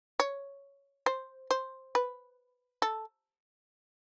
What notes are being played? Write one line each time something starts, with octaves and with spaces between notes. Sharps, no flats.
C#5
C5
C5
B4
A4